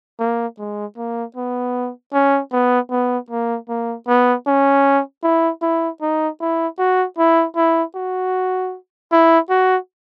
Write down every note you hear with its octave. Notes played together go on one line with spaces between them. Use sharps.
A#3
G#3
A#3
B3
C#4
B3
B3
A#3
A#3
B3
C#4
E4
E4
D#4
E4
F#4
E4
E4
F#4
E4
F#4